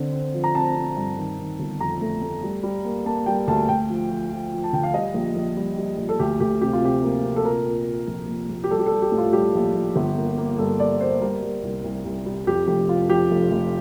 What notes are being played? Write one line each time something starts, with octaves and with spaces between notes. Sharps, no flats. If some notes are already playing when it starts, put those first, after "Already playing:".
Already playing: D3 C4
C4
F3
A#5
C4 A5
C4
G2
D#3
D#3
G1
F2 A#5
A3
A3
G3
G3
A#3
A#3 A5
G3 G5
D2 A5
D2 G5
F3
F3
F3
F3
A5
D3 G5
F5
G3 D#5
A#1
A#1
G3
G3
A#1
A4
D2 G4
D2 G4
C3 G4
F4
C3 G4
A#3
C3
A4
A#2 A#4
A#2
A#2
A#1
A#1
A#1
G4
G3 A4
G4
A4
G3
G4
A2
F4
G3 G4
A#1
A#1
G1
A#3
A#3
G2 A4
A#3 D5
A#3 C5
G3 A#4
G3
C2
C2
C2
G3
F2 G4
F1 G4
F3 F4
F3 G4
F1
F1